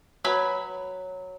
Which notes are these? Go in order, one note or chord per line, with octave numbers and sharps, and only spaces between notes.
F#3 B4 G#5 B5